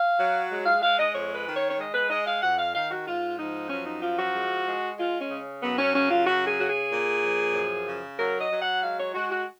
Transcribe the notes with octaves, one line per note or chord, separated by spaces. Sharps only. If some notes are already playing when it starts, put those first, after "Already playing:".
Already playing: F5
F#3
G#3
F5
G#3 F5
D#5
F2 C#5
B4
D#3
C#5
C#5
G#3 D#5
B4
G#3 D#5
F5
F2 F#5
F5
D#3 F5
F#4
G#2 F4
F3 D#4
F#2 C#4
D#4
F3 F4
F#4
G#3
G#3
G#3 F4
C#4
C#3
F#2 B3
C#4
C#3 C#4
F4
F#2 F#4
G#4
C#3 F#4
G#4
A#2
F3
F#2
C#3
F#3 A#4
D#5
F#3
F#5
G#3 F5
C#5
G#3 F#4
F#4